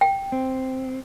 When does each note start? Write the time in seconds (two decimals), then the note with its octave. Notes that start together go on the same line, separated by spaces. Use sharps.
0.01 G5
0.32 C4